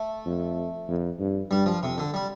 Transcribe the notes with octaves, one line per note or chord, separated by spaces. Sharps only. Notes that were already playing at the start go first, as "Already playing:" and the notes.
Already playing: A3
F2
F2
G2
G2 G3
F3
F2 C3
D3
G3